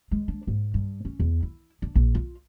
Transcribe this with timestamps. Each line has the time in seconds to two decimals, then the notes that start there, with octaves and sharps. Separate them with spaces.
0.11 G#3
0.28 D4
0.47 G#2
0.74 G2
1.05 C#4
1.20 E2
1.43 E4
1.82 D4
1.95 A#1
2.15 F4